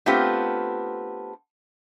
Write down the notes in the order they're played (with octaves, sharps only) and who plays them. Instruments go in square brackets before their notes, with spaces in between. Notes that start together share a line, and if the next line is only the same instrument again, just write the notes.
[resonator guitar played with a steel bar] A3 B3 C4 D4 F4 G4